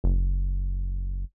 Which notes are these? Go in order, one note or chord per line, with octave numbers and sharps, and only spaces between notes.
F#1